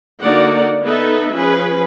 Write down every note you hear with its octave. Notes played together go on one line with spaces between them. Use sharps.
D3 A#3 D#4 F#4 D5 F#5
B3 D#4 A4 B4 E5
F3 C#4 G#4 B4